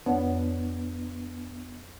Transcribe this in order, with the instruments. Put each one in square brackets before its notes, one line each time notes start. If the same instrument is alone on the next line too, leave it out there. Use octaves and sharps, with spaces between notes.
[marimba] F2 C#5 F#5 [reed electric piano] B3 D4